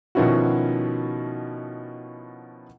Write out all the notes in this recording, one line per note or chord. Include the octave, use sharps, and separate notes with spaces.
B2 D#3 F3 C#4 E4 F#4